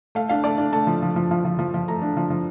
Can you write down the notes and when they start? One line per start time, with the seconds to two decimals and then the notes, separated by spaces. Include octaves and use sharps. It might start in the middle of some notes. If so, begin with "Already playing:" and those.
0.15 A3 F5
0.29 D4 F5
0.44 A3 D5
0.58 D4
0.72 A3 A5
0.87 F3
1.02 F3
1.16 F3
1.31 F3
1.45 F3
1.59 F3
1.74 F3
1.88 A3 A#5
2.02 D4
2.17 F3
2.30 F3